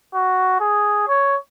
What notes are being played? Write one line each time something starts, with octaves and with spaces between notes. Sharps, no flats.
F#4
G#4
C#5